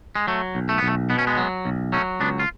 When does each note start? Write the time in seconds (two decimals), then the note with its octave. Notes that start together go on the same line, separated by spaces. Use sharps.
0.15 G#3
0.27 F#3 A3
0.55 B1
0.69 A3
0.78 B3
0.83 B1
0.88 A3
1.10 B2 B3
1.19 C#4
1.27 G#3 B3
1.38 F#3
1.65 B1
1.93 F#3 A3 C#4
2.20 C#2 B3 D4
2.40 F4